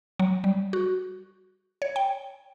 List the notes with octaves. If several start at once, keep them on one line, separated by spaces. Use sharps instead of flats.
F#3
G3
F#4
C#5
G5